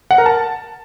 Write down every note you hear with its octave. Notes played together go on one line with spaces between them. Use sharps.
F#5
A#4
A5